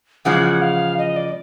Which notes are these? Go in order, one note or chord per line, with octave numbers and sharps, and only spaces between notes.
E2 C#3 F3 G#3 F#5
F5
D#5
D5